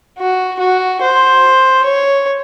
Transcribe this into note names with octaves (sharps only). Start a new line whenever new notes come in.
F#4
F#4
C5
C#5